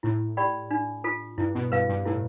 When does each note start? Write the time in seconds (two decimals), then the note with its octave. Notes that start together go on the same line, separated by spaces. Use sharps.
0.03 A2 E4
0.37 G4 D5 G5 B5
0.71 D4
1.04 F4 A4
1.38 G2 E4
1.55 B2
1.72 G2 B4 F5
1.89 G2
2.05 A2 E4